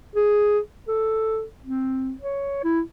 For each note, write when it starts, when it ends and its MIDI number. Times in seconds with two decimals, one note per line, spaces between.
0.16 0.60 68
0.88 1.44 69
1.64 2.13 60
2.22 2.63 73
2.64 2.81 64